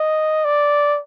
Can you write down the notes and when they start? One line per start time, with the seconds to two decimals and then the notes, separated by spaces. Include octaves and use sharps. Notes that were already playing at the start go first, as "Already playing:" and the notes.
Already playing: D#5
0.45 D5